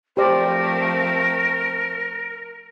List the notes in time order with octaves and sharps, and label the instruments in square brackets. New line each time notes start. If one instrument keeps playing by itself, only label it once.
[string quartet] F3 A3 C4 [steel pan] G4 C5 D5 [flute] A#4